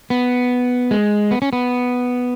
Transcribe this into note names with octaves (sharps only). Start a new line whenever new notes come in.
B3
G#3
B3
C#4
B3